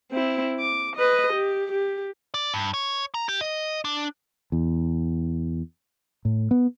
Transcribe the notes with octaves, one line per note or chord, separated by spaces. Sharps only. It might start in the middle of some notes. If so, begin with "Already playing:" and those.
C4 E4
D6
B4 D#5
G4
G4
D5
G2
C#5
A#5
G4
D#5
D4
E2
A2
B3